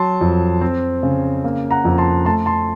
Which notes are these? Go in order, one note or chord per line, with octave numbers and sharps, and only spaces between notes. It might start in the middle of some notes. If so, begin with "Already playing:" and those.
Already playing: F#3 A5 C6
F2
C4
C#3
A#3
F#5 A#5
F2
A5 C6
A3 A5 C6
A5 C6